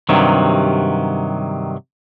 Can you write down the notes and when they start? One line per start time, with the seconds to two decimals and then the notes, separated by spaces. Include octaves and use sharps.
0.09 G2 C3 D#3 F#3